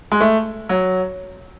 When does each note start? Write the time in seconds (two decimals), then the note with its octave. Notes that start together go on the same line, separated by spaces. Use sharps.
0.12 G#3
0.21 A3
0.69 F#3